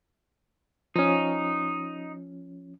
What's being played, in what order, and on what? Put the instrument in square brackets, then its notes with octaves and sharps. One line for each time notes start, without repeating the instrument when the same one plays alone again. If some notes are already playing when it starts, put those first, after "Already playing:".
[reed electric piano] F3 C#4 [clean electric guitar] D#4